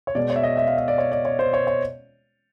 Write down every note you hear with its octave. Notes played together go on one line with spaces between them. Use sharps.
C#5
B2 G#3 B3 D5
C#5
E5
D#5
E5
F5
E5
D5
C#5
D5
C#5
C5
C#5
C#5